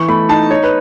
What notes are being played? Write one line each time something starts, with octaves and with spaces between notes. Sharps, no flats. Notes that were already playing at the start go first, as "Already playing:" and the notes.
Already playing: E3 C#6
A3 B5
D#4 A5
D#4 C#5
B4